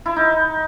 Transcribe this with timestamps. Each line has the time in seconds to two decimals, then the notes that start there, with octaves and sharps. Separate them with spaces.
0.06 E4
0.16 D#4